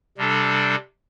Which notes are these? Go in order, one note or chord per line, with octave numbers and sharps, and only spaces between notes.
C3 G3 D4 A4